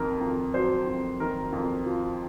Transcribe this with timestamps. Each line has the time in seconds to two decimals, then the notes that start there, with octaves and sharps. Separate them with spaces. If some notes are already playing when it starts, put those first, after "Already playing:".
Already playing: F2 D#3 A#4
0.21 F2
0.54 F#3 C5
0.87 F2
1.20 D#3 A#4
1.52 F2
1.86 F3